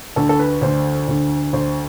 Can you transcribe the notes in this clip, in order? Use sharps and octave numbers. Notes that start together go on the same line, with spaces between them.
D2 D3 A4
A4
B4
D2 D3 C5
D2 D3
D2 D3 C5